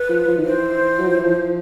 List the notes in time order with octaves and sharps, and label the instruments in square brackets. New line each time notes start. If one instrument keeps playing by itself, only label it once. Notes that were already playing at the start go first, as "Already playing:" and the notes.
Already playing: [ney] B4
[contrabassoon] F3
F3
D#3
[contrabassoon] E3 [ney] C5
[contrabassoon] F#3
F3
E3
F3